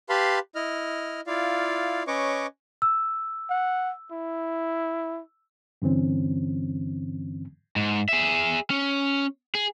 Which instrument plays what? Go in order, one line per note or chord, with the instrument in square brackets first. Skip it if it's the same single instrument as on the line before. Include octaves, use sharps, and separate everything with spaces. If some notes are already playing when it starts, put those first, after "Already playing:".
[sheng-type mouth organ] G4 B4 F5 A5 B5 C6
E4 D#5 F6
E4 F4 D5 F5
C#4 B4 C#5 D#5 C#6 D6
[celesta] E6
[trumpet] F#5
E4
[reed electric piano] G2 D3 E3 C4 C#4
[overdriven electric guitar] G#2
G#4 E5
C#4
G#4